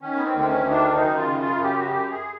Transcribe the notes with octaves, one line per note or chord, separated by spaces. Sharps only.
D#3 C#4
B3
C4
D2
C4
C#4
D#3
D4
F#2 D#4
F4
C#3
F4
F#2
G4
F#4
F#2 G4
G#4